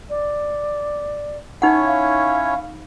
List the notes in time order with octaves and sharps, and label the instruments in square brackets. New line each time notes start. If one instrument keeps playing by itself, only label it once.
[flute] D5
[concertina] C#4 E4 C#5 [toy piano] D#4 F#5
[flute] F5